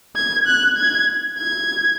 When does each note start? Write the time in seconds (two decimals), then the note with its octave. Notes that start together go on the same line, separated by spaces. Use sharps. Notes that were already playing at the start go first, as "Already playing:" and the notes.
0.16 G#6
0.47 F#6
0.77 G#6
1.38 G#6